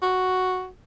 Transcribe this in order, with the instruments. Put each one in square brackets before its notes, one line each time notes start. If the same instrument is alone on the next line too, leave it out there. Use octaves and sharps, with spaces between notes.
[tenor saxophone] F#4